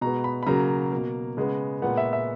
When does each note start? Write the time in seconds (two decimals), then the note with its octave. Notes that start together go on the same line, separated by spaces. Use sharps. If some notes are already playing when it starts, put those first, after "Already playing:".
0.01 B2 G#3 B3 A#5
0.24 B5
0.43 B5
0.47 C#3 F#3 A#3 A#5
0.92 B2 A#3
1.37 C#3 G#3 B3
1.82 A#2 G#3 B3 F#5
1.97 E5
2.13 E5